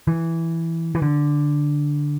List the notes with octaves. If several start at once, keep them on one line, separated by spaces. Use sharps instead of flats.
E3
E3
D3